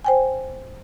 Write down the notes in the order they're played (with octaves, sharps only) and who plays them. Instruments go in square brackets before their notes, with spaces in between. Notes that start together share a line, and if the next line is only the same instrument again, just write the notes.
[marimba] C5 G5 G#5